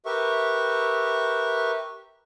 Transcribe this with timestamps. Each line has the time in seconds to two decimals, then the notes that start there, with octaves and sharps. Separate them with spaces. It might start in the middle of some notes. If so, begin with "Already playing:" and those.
0.06 G4 A#4 B4 E5 C#6